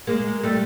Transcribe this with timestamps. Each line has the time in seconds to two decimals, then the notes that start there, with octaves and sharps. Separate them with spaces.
0.07 G#3 A#3
0.43 G3 A3